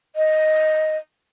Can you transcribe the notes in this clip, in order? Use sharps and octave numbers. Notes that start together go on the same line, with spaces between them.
D#5